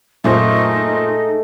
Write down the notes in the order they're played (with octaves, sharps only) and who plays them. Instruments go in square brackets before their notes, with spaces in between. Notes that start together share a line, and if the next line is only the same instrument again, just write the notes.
[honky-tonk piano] F#2 A#2 C5 [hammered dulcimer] G#3 A3 [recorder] D#4